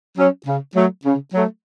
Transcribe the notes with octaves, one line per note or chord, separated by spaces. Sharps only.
F#3 C#4
C#3
F#3 A3
C#3
F#3 A3